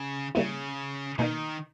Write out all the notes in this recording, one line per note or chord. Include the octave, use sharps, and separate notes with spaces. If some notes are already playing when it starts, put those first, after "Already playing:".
Already playing: C#3
C#3 G3 A#3 E4
B2 D#3 A#3 D#4